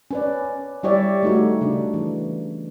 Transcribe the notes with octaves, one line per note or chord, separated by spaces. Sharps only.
C#4 B4 D5
G3 E4 G4 C#5 D5 E5
A3 D#4 F#4
C#3 D4
E3